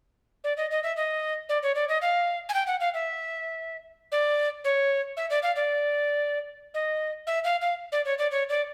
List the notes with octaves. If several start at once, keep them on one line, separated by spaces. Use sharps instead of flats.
D5
D#5
D#5
E5
D#5
D5
C#5
D5
D#5
F5
G#5
G5
F#5
F5
E5
D5
C#5
E5
D5
F5
D5
D#5
E5
F5
F5
D5
C#5
D5
C#5
D5